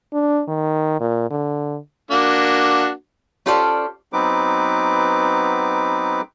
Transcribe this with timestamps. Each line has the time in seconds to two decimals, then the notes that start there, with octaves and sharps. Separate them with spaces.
0.13 D4
0.48 D#3
1.00 A#2
1.31 D3
2.11 A#3 D4 F#4
3.46 C#4 F4 G4 A4 C5 D5
4.13 F#3 B3 C4 D#4 B4 D6